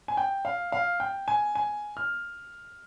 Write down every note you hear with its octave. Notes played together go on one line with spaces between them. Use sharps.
G#5
G5
F5
F5
G5
G#5
G#5
F6